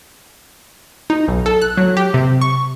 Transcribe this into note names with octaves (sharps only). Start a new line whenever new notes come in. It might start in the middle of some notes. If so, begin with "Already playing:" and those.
D#4
B1
A4
F#6
F#3
G4
C3
C#6